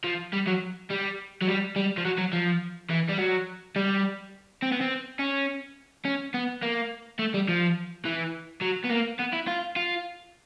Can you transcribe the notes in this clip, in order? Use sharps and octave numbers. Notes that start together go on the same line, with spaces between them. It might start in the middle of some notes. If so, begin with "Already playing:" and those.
F3
G3
F#3
G3
F#3
G3
G3
F3
F#3
F#3
F3
E3
G3
F#3
G3
C4
B3
C4
C#4
C#4
B3
A#3
A3
G3
F3
E3
F#3
B3
A#3
B3
E4
F4
F4